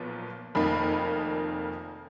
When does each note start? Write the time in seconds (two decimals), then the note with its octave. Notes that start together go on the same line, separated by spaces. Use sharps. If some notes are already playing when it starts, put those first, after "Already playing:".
Already playing: B1 A#2 F3 B3
0.55 F1 F2 D#3 A#3 D#4 B5